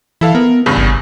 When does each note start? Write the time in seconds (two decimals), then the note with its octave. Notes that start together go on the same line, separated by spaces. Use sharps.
0.21 E3 E4 A4 F5
0.35 B3 A#4
0.66 E2 G2 C#3
0.78 G#1